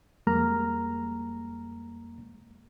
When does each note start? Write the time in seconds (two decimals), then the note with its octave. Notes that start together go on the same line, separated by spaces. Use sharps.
0.27 F2 G3 G#3 A#3 A#5 F6